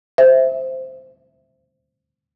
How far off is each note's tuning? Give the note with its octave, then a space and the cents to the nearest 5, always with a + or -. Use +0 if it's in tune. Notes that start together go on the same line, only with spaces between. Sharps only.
C5 +0 E5 +0